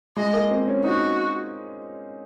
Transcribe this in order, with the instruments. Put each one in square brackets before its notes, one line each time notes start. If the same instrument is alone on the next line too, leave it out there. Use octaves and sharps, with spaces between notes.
[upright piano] G#3 [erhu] D#5
[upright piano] A#3
C4
C#4
[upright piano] D#4 [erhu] F#4